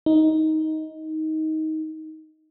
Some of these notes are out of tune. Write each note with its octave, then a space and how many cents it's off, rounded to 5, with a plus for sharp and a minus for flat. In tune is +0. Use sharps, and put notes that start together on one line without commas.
D#4 +15